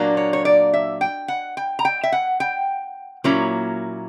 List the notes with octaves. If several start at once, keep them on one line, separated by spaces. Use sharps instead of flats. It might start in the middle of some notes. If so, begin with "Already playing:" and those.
Already playing: A#2 F#3 A#3 D4
C#5
C#5
D5
E5
G5
F#5
G5
A#5
G5
E5
F#5
G5
A#2 F#3 A#3 C#4 E4 A#5